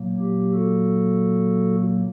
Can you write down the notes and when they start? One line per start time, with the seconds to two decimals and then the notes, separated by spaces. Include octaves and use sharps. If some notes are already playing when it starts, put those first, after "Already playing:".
Already playing: A#2 F#3 A#3
0.19 G4
0.54 F#4 A4